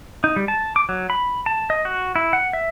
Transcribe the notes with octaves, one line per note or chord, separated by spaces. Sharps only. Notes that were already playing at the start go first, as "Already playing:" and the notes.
D#4
G3
A5
D6
F#3
B5
A5
D#5
F#4
E4
F#5
E5